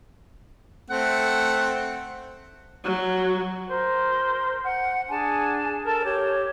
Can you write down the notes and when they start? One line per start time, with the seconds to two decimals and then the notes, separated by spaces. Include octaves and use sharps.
0.90 A3 C4 F#5
2.85 F#3
3.70 A#4 C5
4.65 F#5
5.09 D4 G#4 G#5 A5
5.85 A4 A#4 A5
6.05 G4 C#5